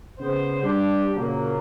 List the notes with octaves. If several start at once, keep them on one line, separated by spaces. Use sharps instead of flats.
C#3 B3 C5
G3 D4 G4
A#2 C#3 F3 F#3 A#3